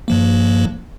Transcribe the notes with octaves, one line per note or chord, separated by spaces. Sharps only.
G2 F3 A#3